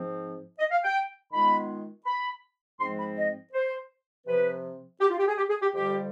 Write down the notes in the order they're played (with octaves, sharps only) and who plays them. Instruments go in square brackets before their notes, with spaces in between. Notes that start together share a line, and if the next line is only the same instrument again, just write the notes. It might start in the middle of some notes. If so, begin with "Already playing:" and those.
Already playing: [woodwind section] G#2 F3 C4
D#5
F5
G5
D#3 G#3 B3 F4 B5
B5
G#2 F3 G#3 C4 C6
B5
D#5
C5
C3 F3 C4 B4
G4
F4
G4
G#4
G4
G#4
G4
F2 D3 G3 G4